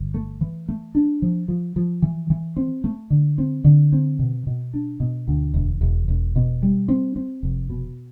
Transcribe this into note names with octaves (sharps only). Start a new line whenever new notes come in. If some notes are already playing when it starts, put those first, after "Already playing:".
Already playing: G1
A3
E3
A3
D4
F3
F3
F3
E3
E3
C4
A3
D3
C4
D3
C4
B2
B2
D4
B2
D2
E1
E1
E1
B2
G3
C4
C4
F1
B2